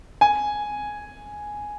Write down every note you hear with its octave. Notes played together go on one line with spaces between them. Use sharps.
G#5